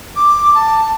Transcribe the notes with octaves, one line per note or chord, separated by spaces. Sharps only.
D6
A5